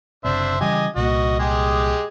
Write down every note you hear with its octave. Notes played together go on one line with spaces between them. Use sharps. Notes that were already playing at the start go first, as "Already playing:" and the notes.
F#1 C3 D4 C5 E5
C#3 E3 G3 G4 D#5 G#5
C2 A#2 A#3 F#4 D#5
G#3 G4 G#4